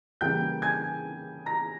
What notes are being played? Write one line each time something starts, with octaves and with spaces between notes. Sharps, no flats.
C#3 E3 G3 A#3 G5 G6
G#5 G#6
A#5 A#6